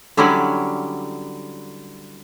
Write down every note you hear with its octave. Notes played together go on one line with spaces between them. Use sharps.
D3 F#3 G3 C#4 E4 D5